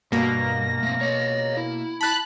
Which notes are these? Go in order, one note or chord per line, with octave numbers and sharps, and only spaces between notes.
G2 B2 A#3 A#6
A3 C4
C#5 D#5
E4
A5 B5 F#6